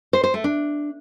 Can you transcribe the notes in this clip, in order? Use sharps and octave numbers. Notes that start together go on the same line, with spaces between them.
C5
C5
A3
D4